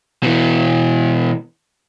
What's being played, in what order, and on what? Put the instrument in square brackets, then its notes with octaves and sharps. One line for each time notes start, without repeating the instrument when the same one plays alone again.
[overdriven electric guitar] B2 E3